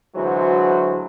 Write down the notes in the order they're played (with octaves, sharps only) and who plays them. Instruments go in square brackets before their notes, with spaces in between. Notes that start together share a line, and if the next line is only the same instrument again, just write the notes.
[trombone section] D2 E3 F#3 G#3 F#4 C5